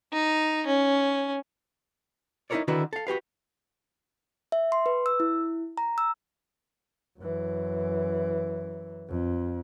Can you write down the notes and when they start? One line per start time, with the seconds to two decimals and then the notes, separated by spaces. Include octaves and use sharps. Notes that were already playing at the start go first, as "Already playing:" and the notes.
0.13 D#4
0.66 C#4
2.50 D#4 E4 A4 A#4 C#5 D5
2.68 D3 D#3 E4 F#4 B4
2.93 A4 F5
3.07 F#4 G4 B4 F5
4.52 E5
4.72 C6
4.86 B4
5.06 E6
5.20 E4
5.78 A#5
5.98 E6
7.19 F#2 E3
9.09 F2